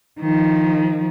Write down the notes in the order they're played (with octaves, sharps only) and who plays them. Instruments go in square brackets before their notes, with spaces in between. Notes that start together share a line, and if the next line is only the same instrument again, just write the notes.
[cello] D#3 F3